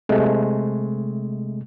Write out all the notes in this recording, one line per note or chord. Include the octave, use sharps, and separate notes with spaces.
C3 G#3 A3